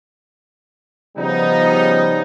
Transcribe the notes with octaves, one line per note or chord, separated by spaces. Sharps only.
C#3 F3 G3 B3 D#4